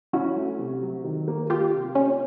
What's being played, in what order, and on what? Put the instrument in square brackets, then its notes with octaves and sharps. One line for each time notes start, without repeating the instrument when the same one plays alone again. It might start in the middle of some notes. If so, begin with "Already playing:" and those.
[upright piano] C#4 [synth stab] E4 F#4
[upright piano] A3
C3
F#3
D#3
A#3
[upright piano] A#3 [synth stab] F4 G4
[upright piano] C3
[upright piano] A#3 [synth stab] C#4